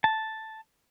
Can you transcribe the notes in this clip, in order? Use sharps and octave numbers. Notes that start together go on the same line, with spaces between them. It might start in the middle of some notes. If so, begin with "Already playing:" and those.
A5